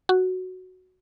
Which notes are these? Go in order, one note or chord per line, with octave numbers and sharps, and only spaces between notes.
F#4